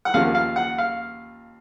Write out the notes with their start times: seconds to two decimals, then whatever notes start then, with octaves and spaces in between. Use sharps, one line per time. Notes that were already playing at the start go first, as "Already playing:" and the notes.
0.05 F#5
0.14 D#2 C#3 F3 A#3 F5
0.35 F5
0.56 F#5
0.78 F5